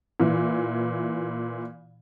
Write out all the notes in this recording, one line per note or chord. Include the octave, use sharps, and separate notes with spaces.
A#2 E3